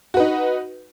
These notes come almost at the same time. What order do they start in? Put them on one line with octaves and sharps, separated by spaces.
F#4 B4 D#4